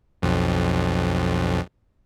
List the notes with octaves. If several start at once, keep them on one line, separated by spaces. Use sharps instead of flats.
B1 F2